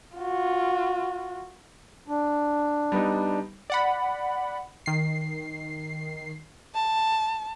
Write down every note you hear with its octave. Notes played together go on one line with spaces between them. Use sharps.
F4 F#4
D4
G3 B3 D#4
D5 F#5 B5
D#3 C7
A5